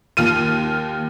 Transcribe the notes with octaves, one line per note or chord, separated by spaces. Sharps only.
D#2 F4 F6 D#7